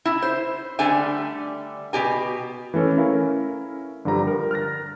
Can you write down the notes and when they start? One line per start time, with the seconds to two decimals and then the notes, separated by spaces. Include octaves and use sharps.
0.05 E4
0.22 C5
0.79 D3 G3 A3 D4 G#5
1.93 B2 G4 G#5
2.74 E3 A3 C#4 A4
2.97 C#4 E4 A#4 F5
4.05 G2 D3 F3 G3 A#5
4.27 A#4
4.51 F6 F#6 A6 A#6